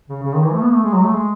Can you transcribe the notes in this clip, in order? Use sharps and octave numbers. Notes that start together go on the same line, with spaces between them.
C#3
C#3
D#3
E3
A3
B3
A3
G#3
F#3
A3
G#3